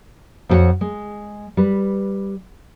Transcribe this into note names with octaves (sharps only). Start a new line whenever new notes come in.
F2 E4 F#4 A4 C#5 F#5
G#3
G3 B4